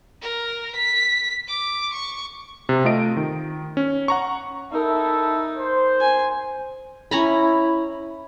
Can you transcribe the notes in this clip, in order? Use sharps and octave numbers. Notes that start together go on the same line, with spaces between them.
A#4
B6
D6
C#6
C3
A3 F4 D#5 D7
D#3
C#4
F#5 A#5 C#6
D#4 E4 A4 A#4 E5
C5
G#5
C#4 E4 A#5 B5